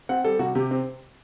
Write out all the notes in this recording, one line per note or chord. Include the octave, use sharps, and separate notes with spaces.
C4 F#5
G3 A4
C3 F#4
C3 G4
C4